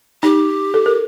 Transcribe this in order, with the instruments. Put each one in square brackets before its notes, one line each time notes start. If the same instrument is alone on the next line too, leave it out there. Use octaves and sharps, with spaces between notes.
[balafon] D#4 [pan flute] G4
[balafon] A4
A#4